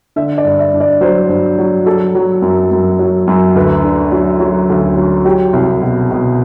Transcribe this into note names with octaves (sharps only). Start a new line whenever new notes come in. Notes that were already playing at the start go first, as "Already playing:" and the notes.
D3 E5
D5
G2
E5
G2
D5
F#3 C5
G2
F#3
F#3 A4
F#3
F#2
F#2
F#3
F#2
D2 B4
D3
F#3
F#3
D2
F#3
F#3 G4
C2
B2
B2